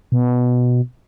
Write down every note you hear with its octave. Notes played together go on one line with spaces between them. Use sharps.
B2